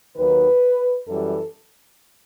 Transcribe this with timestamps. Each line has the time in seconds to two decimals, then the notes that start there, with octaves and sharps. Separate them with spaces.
0.17 D#2 D#3 F#3 B4
1.06 F#2 E3 G3 A4